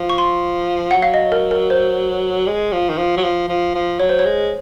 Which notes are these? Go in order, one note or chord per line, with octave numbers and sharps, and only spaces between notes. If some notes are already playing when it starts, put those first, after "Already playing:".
Already playing: F3
C#6
C6
F#3 F#5
F5
D#5
A#4
A#4
C5
G#3
F3
D#3
F3
F#3
F3
F3
F3
F#3 C#5
C5
C#5
G#3